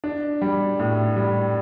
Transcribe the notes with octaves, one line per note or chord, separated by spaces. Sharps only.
D4
G3
A2
G3